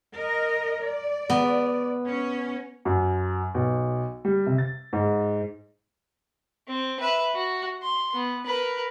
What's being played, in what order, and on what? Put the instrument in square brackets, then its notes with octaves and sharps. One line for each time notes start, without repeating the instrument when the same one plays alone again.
[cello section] A#4 D#5
D5
[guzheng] B3
[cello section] C#4
[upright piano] F#2
B1
G3
C3
A6
G#2
[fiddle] C4
B4 E5
F#4
C6
B3
A#4 B4